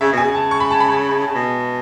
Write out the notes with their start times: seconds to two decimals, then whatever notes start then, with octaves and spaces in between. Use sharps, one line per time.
0.01 C#3 E5
0.13 B2 G#5
0.23 C#3
0.35 A5
0.51 C#6
0.60 B5
0.71 A5
0.80 B5
1.27 C#3
1.35 B2